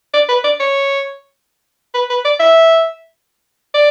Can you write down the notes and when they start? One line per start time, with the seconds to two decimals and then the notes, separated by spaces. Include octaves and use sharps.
0.14 D5
0.29 B4
0.44 D5
0.60 C#5
1.94 B4
2.10 B4
2.25 D5
2.40 E5
3.74 D5